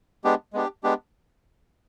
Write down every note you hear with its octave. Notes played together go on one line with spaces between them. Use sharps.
G#3 B3 D4 G4
G#3 B3 D4 G4
G#3 B3 D4 G4